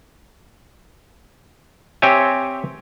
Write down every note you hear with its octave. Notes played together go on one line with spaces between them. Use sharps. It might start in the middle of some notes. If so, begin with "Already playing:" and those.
C4 G4 C#5 E5 G#5